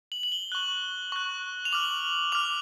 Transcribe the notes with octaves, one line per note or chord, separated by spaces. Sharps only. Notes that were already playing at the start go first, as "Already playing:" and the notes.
F#7
F#7
G7
C#6 F#6
C#6 F#6
F7
D6 F6 F#7
D6 F6 F7